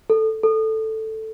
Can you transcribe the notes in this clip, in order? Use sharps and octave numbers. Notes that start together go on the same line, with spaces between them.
A4
A4